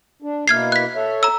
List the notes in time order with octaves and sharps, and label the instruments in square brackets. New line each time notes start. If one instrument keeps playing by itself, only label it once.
[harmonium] D4
[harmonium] B2 A#3 E4 [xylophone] F6 G#6 C7
[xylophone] F#6 B6
[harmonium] A4 C#5 E5
[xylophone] A#5 E6